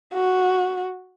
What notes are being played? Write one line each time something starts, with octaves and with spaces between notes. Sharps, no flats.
F#4